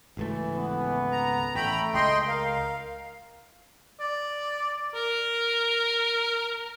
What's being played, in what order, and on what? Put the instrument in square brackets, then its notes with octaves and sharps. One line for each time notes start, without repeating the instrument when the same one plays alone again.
[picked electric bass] G#1 C#2 A3 [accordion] E3
[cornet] B3
[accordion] A#5
[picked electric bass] A1 [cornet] A3 [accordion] G5 A#5 B5
[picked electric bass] C#2 [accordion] D#5 G5 C6
[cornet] A#4 [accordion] F5
[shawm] D5
A#4